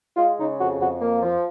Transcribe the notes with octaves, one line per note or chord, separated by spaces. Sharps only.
G#3 F4
C#3 D#4
F2 F#4
F2 F#4
A#3
F3